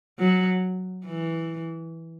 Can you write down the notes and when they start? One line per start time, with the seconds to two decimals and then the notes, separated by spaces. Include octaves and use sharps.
0.19 F#3
1.07 E3